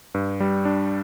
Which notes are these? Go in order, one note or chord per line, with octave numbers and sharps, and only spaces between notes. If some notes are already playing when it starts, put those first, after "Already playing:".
G2
G3
D4